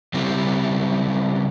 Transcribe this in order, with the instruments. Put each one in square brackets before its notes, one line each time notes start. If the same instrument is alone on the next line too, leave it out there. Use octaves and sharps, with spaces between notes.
[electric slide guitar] C#3 G3 C4 E4 G4